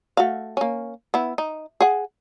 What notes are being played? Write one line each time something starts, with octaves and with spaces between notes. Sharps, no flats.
A3 F#4 F5
A#3 C#4
B3 E4
D#4
G#4 F#5